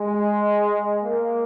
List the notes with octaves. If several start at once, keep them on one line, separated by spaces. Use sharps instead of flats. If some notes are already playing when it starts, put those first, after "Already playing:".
Already playing: G#3
A#3